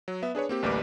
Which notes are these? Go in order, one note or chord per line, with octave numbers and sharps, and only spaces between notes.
F#3
B3 E5
D4 G#4 B4 C#5
A#3 C4 G4
A1 D2 G3 A#3 B4 D6